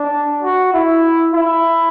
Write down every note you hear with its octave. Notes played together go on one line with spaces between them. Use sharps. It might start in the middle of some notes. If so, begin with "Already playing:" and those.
Already playing: D4
F#4
E4
E4